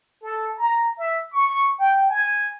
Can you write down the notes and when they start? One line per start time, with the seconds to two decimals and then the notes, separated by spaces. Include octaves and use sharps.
0.22 A4
0.57 A#5
0.98 E5
1.32 C#6
1.79 G5
2.09 G#5